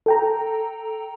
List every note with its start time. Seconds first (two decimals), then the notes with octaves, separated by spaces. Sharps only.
0.06 A4 G5 A#5